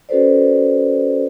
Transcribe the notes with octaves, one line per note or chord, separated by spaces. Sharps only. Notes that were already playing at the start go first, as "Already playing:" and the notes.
C#4 F#4 A4 B4 C5 D5